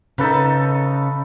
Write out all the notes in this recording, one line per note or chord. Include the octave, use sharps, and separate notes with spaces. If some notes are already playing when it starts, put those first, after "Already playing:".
C#3 D#4 A4 B4